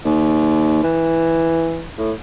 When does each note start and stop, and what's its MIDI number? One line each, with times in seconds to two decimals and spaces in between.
0.05 0.79 39
0.83 1.88 52
1.98 2.12 45